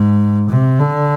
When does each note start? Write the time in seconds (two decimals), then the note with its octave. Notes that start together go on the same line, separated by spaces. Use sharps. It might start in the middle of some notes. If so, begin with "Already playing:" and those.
Already playing: G#2
0.50 C3
0.79 D3